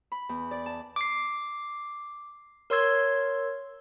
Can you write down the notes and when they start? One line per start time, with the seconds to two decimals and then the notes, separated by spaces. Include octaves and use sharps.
0.12 B5
0.29 E2
0.51 D5
0.66 A5
0.96 D6 C7
2.70 A#4 C#5 C6 E6 G#6